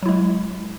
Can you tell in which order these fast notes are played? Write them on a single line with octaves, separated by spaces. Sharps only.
F#3 E4 G#3